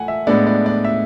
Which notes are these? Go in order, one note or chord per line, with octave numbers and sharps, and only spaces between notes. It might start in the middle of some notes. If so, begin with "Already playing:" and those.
Already playing: A3 F#5 G#5
E5
A2 G#3 B3 D4 D5
D5
D5
E5